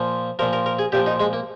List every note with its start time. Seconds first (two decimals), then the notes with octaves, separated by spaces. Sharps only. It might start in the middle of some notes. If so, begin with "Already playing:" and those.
Already playing: A#2 F3
0.39 F3 A#4
0.42 A#2
0.53 A#4
0.66 A#4
0.79 G#4
0.92 A#2 F3 G4
1.06 D#4
1.20 G#3
1.33 A#3